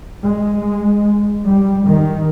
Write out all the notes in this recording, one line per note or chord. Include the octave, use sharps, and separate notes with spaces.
G#3
G3
D#3